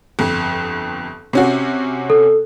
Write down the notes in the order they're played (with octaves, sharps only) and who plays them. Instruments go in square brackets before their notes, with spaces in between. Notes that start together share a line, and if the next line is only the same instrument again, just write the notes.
[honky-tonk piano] G1 F2
C3 C#4 F#4
[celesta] A4